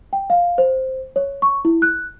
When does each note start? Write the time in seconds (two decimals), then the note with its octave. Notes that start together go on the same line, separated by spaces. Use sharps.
0.13 G5
0.30 F5
0.58 C5
1.16 C#5
1.42 C#6
1.65 E4
1.82 F#6